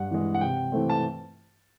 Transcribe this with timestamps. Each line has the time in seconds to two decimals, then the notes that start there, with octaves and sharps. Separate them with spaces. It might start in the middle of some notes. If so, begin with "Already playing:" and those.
Already playing: G2 F#5
0.11 E3 G#3
0.34 F#5
0.41 C3 G5
0.72 E3 A3 C4
0.89 A5